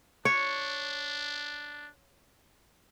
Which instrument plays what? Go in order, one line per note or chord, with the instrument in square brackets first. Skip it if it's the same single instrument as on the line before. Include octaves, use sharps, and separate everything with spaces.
[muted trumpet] D4 [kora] C#5